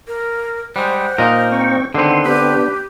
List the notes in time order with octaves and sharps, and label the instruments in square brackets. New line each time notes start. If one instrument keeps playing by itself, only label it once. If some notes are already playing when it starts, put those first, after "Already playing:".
[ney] A#4
[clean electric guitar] G3 G#3 [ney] C5 [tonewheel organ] F#5
[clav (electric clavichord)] A#2 D#5 [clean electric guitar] D#4 A#4
[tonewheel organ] C4 G5 C#6
[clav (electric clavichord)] D3 C4 [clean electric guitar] D#3 B3 [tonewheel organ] C6
[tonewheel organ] B3 D4 [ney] G4 [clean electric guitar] B4